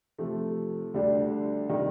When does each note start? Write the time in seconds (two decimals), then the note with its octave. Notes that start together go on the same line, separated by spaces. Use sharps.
0.18 C3 F3 A3
0.94 D2 D3 G3 D4
1.69 C3 D#3 G3